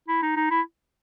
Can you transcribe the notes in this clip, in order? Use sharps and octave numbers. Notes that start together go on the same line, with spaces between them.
E4
D#4
D#4
E4